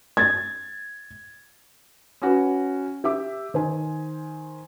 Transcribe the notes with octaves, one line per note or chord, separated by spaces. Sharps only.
G#6 A6
C#4 F#4 B4
G4 E5 D6
D#3 C5 G#5